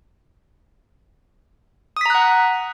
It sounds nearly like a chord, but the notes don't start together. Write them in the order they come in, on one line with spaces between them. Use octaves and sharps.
D#6 B6 A#5 F#6 F#5